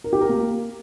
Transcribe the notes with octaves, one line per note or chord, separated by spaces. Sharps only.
A#4
G4
A#4
A#3